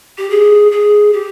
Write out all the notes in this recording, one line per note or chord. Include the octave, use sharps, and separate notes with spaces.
G4
G#4
G#4
G4